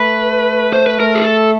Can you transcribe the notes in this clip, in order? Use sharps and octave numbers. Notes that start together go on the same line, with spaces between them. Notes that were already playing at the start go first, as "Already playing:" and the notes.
Already playing: A3 B4
C5
B4
A3 A#4
G#4
A4